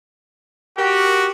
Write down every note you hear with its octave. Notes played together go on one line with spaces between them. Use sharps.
F#4 G4 A#4